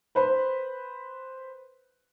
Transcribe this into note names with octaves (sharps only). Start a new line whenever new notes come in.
B4 C5 B5